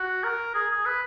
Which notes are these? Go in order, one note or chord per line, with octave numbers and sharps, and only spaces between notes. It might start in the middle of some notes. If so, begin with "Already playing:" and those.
Already playing: F#4
A#4
G#4
G#4
B4